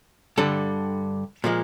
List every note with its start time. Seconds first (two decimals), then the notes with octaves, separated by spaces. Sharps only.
0.37 G2 D3 G3 A4
1.44 A#2 F3 G#3